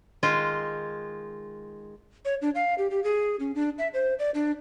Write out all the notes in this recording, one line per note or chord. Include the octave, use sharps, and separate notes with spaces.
D#3 G#3 F4
C#5
D4
F5
G4
G4
G#4
C#4
D4
E5
C5
D5
D4